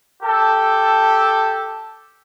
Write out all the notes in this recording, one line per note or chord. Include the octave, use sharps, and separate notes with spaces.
G4 A4